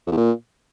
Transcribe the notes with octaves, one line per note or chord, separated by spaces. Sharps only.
F2
E2
A#2